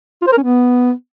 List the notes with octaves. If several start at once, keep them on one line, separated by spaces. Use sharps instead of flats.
F4
C5
A#4
C#4
B3